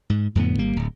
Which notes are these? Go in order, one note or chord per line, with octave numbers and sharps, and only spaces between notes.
G#2
F2 A2 D3 B3
G#1 G3 A#3
D1